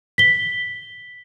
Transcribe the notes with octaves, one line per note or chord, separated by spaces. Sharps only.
B6 G7